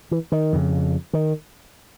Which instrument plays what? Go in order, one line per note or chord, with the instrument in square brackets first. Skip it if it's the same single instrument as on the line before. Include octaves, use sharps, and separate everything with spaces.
[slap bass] E3
D#3
F2 C#3
D#3